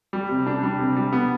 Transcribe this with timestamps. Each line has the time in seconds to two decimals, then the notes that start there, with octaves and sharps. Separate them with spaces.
0.13 G3
0.30 C3
0.47 D4
0.63 G3
0.79 C3
0.96 G3
1.13 B3